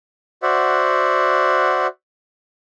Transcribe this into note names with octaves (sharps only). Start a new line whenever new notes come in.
F#4 C5 D5 E5 F#5